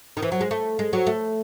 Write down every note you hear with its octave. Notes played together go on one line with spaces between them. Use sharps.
D#3
E3
F#3
G#3
A3
G#3
F#3
A3